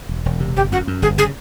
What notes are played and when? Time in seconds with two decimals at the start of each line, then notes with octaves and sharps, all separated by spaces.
0.09 E1
0.26 E1
0.40 C3
0.56 G1 G4
0.72 F#2 F#4
0.87 F#2
1.02 G1 G#4
1.18 C#3 G#4